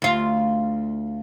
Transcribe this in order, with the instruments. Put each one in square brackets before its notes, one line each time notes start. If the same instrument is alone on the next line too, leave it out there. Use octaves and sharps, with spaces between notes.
[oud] D2 F4